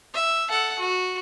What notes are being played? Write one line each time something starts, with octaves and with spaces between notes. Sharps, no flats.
E5
A4 F#5
F#4